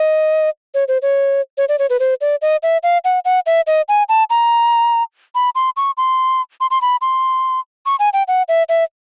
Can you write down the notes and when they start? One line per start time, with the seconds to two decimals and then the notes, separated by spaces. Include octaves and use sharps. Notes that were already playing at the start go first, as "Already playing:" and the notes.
Already playing: D#5
0.74 C#5
0.88 C5
1.02 C#5
1.58 C#5
1.69 D5
1.79 C#5
1.90 B4
2.00 C5
2.21 D5
2.42 D#5
2.63 E5
2.83 F5
3.05 F#5
3.25 F#5
3.46 E5
3.67 D#5
3.89 G#5
4.09 A5
4.30 A#5
5.35 B5
5.55 C6
5.77 C#6
5.97 C6
6.61 C6
6.71 C6
6.82 B5
7.01 C6
7.86 C#6
7.99 G#5
8.13 G5
8.28 F#5
8.48 E5
8.69 E5